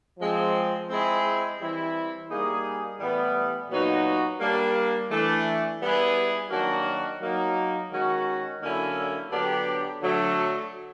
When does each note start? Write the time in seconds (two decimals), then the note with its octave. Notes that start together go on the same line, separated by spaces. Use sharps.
0.19 F3 G#3 C4
0.89 G#3 C4 E4 G#4
1.60 E3 G3 C4 E4
2.30 G3 A#3 D#4 G#4
3.00 A2 E3 G3 B3
3.70 A#2 F#3 B3 D#4 F#4
4.40 G3 A#3 D4
5.11 E3 A3 D4
5.81 G3 B3 E4 G#4
6.50 D#3 F#3 A#3 D4 F#4
7.21 F#3 A#3 D#4
7.91 D#3 G#3 C#4 F#4
8.61 D3 F#3 A#3 C#4 E4
9.31 D3 F#3 B3 D4 G4
10.01 D3 F#3 A3